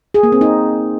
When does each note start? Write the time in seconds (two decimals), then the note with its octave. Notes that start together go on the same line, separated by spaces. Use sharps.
0.14 G#4
0.23 A#3
0.32 C4
0.41 D#4